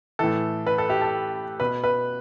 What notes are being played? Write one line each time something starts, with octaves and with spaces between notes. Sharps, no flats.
A2 E3 A4
B4
A4
G4
A4
B2 B4
B4